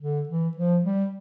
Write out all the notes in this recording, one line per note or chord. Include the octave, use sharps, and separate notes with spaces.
D3
E3
F3
G3